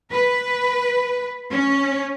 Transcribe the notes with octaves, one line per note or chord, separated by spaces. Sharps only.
B4
C#4